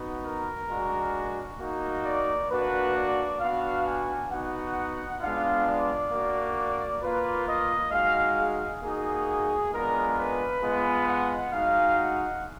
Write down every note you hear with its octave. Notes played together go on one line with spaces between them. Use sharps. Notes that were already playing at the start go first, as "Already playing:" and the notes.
Already playing: B3 D#4 F#4
A#4
G#3 D4 F#4
A#3 D#4 F#4
D5
A#3 D4 F#4 B4
D5
B3 D4 F#4 F5
G#5
B3 D#4 F#4 F#5
G#3 B3 D4 F4 F5
D5
A#3 D4 F#4
A#3 F4 B4
D#5
G#3 D#4 F#4 F5
G#4
A#3 D#4 F#4 G#4
G#3 B3 D4 F4 A#4
B4
G#3 B3 F4
F#5
G#3 D#4 F#4 F5
F#5